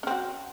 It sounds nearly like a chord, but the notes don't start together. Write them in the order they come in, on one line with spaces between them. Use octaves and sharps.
C#4 C4 F#4